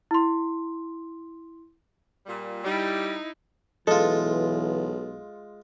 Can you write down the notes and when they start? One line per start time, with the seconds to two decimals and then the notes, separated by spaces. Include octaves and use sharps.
0.11 E4 C6
2.26 A#2 G3
2.65 G3 D#4 E4
3.87 B1 E3 G#3 F4 A4